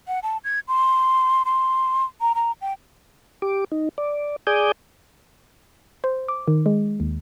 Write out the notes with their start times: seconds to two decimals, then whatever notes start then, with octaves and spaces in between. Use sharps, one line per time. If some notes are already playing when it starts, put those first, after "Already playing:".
0.08 F#5
0.23 A5
0.44 G#6
0.68 C6
1.45 C6
2.21 A#5
2.35 A#5
2.61 G5
3.42 G4 D6
3.72 D#4
3.98 D5
4.47 G#4 D5 G#5 D6 D#6 G6
6.04 C5
6.28 D6
6.48 D#3
6.66 G#3
7.00 D#2